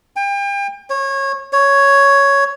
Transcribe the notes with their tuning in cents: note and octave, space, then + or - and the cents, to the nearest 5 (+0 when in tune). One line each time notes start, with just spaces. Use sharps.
G5 +35
C#5 -25
C#5 +5